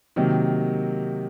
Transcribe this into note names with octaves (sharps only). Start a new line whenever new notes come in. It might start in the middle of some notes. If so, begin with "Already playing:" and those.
C3 D#3 F#3 A#3